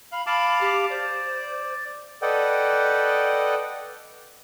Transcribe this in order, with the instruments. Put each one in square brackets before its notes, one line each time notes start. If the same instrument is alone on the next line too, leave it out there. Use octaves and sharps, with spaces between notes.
[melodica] F5 [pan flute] B5
[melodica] F5 A5 D6 [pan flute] B5
[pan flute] G4
[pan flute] C5 [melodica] D5
[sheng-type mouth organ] A4 B4 D5 D#5 F#5 G5